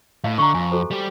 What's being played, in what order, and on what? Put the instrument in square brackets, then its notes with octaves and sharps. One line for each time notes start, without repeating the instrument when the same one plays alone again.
[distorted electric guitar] A2 [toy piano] D#5 F5
[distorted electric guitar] D3 [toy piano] A#5 C#6
[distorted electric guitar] F2 [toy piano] G#5
[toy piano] F#4 A4 C5
[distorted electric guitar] G3 G4